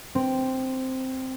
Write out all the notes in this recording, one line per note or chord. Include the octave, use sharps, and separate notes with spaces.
C4